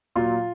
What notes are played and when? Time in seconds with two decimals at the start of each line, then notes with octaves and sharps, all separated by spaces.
0.16 A#2 F#3 F4